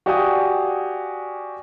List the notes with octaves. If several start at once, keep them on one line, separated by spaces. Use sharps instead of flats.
F#4 G4 D5 F5 G#5 D#6